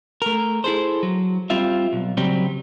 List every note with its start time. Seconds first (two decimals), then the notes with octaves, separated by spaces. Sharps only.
0.22 A3 A#4
0.64 E4 G#4 A4 C5
1.03 F#3
1.50 G3 C4 F4 E5
1.93 B1
2.17 C#3 F#3 G3 C4